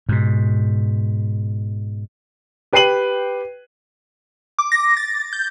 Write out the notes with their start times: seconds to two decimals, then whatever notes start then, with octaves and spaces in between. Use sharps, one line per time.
0.09 G#2 B2
2.73 G4 B4 G5 C7 D#7 F#7
4.59 D6
4.72 A#6
4.97 A6
5.33 G6